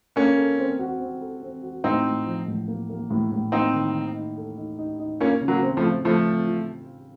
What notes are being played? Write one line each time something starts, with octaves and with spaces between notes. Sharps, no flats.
A#3 C#4 A4
A4
C4
F#4
C4
A4
C4
F#4
A2 C4 D#4
A2
F3
A2
A#3
A#3
A2
A2
A#3 C4 D#4
D#3
D#3
D#4
A4
D#4
D#4
D#4
A#3 C#4 F4
C#3
F#3 A#3
C4
F3 A3
F4
F3 A3 F4
C4
F4